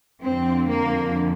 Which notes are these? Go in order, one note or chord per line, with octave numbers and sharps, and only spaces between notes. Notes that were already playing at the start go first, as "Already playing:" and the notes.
F2 D3 C4
A#3